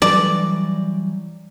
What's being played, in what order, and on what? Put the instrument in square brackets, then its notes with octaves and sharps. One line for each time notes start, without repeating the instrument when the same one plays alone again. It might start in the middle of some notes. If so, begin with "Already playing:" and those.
[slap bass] E3 F#3 G3 [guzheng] D5